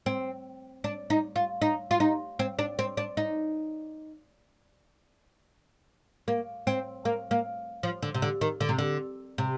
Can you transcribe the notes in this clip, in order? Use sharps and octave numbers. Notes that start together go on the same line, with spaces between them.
C4
D4
D#4
F4
D#4
F4
D#4
C4
D4
C4
D4
D#4
A#3
C4
A#3
A#3
F3
D3
C3
D3
D#3
D3
C3
D3
C3